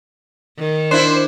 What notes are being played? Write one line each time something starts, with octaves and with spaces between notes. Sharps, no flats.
D#3
D4 E4 C5